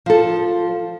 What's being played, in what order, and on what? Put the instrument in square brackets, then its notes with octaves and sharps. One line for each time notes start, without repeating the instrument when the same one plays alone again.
[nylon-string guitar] F3 A4